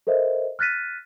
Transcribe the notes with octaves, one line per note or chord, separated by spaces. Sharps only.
A4 A#4 C5 D#5 E5
F6 F#6 A6 B6 D#7